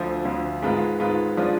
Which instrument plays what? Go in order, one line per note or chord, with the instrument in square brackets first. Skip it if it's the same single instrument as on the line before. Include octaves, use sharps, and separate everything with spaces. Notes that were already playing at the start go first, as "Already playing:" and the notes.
Already playing: [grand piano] D2 D3 F3
D2 D3 F3
G#2 D#3 G#3 B3 F4
G#2 D#3 G#3 B3 F4
F3 G#3 D4 F4